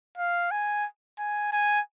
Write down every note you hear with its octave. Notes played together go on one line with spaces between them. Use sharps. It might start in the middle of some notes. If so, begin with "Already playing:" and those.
F5
G#5
G#5
G#5